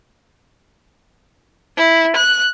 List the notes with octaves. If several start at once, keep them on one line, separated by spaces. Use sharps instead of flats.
E4
F#6